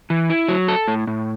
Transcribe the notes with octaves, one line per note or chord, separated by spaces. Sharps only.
E3
E4
F#3
A4
A2
A2